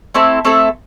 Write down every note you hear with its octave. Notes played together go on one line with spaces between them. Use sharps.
A3 C4 E4 A4
A3 C4 E4 A4